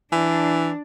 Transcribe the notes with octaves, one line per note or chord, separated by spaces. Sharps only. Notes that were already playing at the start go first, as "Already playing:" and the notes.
E3 D4